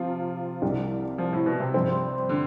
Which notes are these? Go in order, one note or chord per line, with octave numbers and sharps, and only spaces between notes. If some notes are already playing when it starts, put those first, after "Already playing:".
Already playing: C3 F3 C4 F4 C5
C2 C3 G3
F3
A2
B2
C3
G2 F3 C4
D3